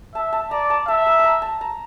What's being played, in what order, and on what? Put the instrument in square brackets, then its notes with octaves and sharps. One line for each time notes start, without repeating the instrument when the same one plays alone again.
[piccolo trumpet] E5 [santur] A5
[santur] A5
[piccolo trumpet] D5 [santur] A#5
[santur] A5
[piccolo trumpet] E5 [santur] A5
[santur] A#5
A5 A#5
A5
A#5